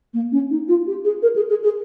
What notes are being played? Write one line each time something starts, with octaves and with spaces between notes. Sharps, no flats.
A#3
C#4
D#4
F4
G4
G#4
A#4
G#4
G#4
G#4